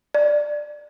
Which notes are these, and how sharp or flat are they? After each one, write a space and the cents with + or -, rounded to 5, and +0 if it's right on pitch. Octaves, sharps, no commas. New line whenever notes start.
D5 +10